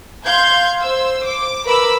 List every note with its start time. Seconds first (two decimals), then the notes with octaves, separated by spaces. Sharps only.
0.25 F5 C6 G6 G#6
0.82 C5 E6
1.25 D6
1.66 A#4 B4 B5 D6 E6